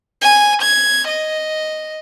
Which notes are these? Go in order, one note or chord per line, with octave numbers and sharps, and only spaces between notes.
G#5
G#6
D#5